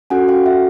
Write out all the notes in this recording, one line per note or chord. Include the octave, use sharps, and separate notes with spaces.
C#4 F#4 A4 F#5 G#5
F5 G5
E5 F#5